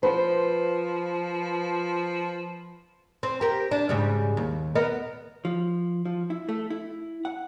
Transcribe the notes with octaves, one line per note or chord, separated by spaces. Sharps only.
F3 B4 C5 B5 D#6
C4
G4 A#4
D4
G#2 C#3 G3
D#2
B3 A#4 D#5
F3
F3
E4
A3
E4
F#5